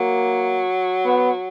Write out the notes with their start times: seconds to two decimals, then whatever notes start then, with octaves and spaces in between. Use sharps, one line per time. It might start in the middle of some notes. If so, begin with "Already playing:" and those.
Already playing: F#3 A#3
1.05 B3